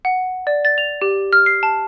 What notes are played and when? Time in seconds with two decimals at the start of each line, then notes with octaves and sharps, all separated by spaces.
0.05 F#5
0.47 D5
0.65 A6
0.78 F7
1.02 G4
1.33 F6
1.46 C7
1.63 A5